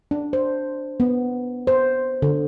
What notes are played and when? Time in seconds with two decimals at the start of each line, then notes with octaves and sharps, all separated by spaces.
0.11 D4
0.33 C5
1.00 B3
1.67 C5
2.22 D3